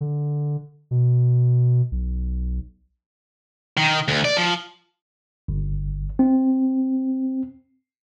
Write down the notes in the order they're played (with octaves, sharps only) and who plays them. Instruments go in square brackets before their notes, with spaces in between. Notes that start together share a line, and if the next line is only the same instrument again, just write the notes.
[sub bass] D3
B2
B1
[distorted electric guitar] D#3
D2
D5
F3
[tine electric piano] G1
C4